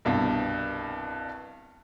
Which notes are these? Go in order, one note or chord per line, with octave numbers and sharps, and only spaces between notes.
C2 G2 B2